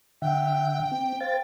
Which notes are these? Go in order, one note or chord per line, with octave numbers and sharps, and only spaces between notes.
D3 E5 F#5 G5
C4
C5 F5 G5 A6